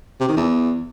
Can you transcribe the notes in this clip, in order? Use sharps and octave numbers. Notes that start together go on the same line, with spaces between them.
C3
D#3
E2